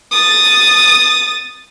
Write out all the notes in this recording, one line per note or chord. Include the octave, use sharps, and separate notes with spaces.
D#6 A6